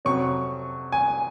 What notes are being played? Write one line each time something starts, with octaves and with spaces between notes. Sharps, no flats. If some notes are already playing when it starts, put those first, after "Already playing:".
F2 C3 F#3 C#4 C#6
G#5